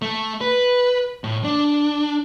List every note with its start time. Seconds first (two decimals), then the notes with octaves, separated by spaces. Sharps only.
0.02 A3
0.41 B4
1.24 A2
1.44 D4